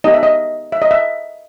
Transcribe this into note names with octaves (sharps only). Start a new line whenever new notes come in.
B3 D#4 G4 D#5
E5
D#5
E5
D#5
E5